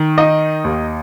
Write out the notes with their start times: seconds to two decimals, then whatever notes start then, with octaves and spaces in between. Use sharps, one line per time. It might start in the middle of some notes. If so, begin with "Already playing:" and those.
Already playing: D#3
0.18 D#4 D#5
0.64 D#2